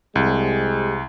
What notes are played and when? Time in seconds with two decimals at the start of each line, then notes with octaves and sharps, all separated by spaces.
0.15 C2 G#3 C4 G4